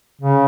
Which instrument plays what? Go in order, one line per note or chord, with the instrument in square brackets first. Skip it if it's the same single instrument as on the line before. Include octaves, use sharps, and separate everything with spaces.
[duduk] C#3